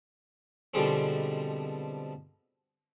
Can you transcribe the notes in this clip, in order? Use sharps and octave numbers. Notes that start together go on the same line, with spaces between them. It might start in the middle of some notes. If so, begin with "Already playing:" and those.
B2 D3 F3 G3 G#3 C4